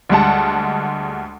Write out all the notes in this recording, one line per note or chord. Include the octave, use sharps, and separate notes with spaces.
D2 G3 G#3 F#5 A5